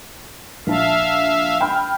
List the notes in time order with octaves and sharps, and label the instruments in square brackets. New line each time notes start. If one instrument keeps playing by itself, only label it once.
[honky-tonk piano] A#1 A5 [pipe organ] E5 F5
[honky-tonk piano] G5 B5 F6